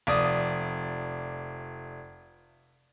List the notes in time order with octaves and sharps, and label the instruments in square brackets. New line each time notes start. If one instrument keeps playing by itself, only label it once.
[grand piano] F1 D5 D#6